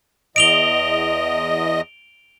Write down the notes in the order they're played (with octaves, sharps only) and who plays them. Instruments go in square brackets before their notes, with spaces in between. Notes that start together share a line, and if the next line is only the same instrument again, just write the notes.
[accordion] E2 D#5 [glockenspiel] D7 F7 G7